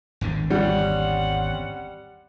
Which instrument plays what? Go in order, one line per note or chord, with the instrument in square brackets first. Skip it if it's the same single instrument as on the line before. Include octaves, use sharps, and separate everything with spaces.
[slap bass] G#1 E2 D3
[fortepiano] G3 [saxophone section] C4 C#4 F#5